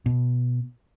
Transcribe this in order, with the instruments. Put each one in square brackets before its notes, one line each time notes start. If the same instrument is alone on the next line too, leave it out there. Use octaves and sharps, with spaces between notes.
[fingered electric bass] B2